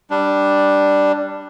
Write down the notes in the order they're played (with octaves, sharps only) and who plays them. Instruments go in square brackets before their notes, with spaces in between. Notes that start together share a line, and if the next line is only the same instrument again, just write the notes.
[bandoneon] G3 D4